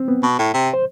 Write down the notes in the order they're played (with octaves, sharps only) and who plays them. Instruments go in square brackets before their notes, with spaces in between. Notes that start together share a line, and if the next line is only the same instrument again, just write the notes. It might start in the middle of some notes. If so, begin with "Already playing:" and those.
Already playing: [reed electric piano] C4
B3
[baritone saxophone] B2
A2
C3
[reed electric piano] C5